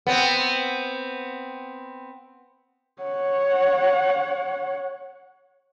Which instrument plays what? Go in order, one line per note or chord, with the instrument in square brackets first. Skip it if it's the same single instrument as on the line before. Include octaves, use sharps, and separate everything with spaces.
[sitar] B3 C4
[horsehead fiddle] C#5 F#5